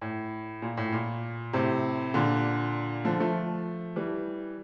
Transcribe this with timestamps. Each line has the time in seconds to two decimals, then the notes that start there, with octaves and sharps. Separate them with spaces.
0.02 A2
0.62 A#2
0.77 A2
0.92 A#2
1.53 A2 C3
2.14 A#2 D3
3.05 D3 F3
3.20 F3 A3
3.96 E3 G3